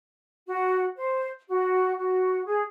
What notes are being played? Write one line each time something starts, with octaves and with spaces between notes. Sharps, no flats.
F#4
C5
F#4
F#4
G#4